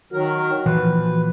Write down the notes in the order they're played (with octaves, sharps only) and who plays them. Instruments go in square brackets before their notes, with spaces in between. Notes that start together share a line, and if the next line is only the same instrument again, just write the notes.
[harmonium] D#3 F#3 A#4 [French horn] F#4
[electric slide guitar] A#2 F3 [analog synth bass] E3 [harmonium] B4